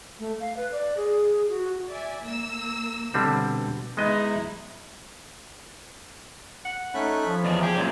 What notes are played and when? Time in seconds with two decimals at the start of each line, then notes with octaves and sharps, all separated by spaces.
0.19 A3
0.40 F5
0.57 B4
0.72 D5
0.97 G#4
1.49 F#4
1.88 D5 E5 G#5
2.23 A#3 E6
3.14 B2 D3 G3 C4
3.97 G#3 B3 D#4 E4 D#5
6.65 F#5
6.94 A3 C#4 D#4 B5 F#6
7.27 F3
7.44 E2 G#4 D5 D#5
7.62 G4 G#4 G5 G#5
7.75 F#2 A#2 D5